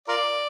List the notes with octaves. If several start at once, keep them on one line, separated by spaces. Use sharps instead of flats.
F4 A#4 D5